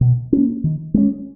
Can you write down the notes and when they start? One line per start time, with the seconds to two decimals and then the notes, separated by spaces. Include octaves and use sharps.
0.01 B2
0.33 A#3 C#4
0.64 D#3
0.94 G#3 C#4